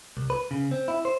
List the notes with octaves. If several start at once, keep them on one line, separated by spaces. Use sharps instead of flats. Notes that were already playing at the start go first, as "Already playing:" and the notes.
C2
B4
C#3
C4
E4
C5